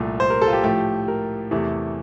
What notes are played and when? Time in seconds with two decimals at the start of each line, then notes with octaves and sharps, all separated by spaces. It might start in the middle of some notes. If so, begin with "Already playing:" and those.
Already playing: C2 A#2 A3
0.20 C5
0.30 A#4
0.42 A4
0.48 F4
0.53 G4
0.63 A2 F3 A3 G4
1.08 A#4
1.51 E2 C3 E3 A3